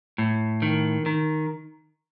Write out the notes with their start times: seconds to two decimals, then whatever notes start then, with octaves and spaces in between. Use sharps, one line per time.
0.18 A2
0.62 D#3
1.06 D#3